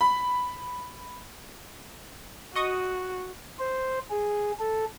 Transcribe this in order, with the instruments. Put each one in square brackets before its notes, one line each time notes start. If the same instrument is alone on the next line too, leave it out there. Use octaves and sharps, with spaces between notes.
[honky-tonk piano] B5
[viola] F#4 [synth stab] D#5 C#6 D#6
[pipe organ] C5
G#4
A4